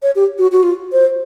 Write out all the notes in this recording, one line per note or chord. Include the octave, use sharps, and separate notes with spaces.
C#5
G4
F#4
F#4
F4
C5